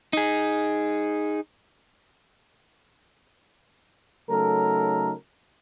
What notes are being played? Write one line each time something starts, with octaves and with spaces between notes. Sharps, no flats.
D#4 G#4
C#3 F#3 A3 D#4 A4 A#4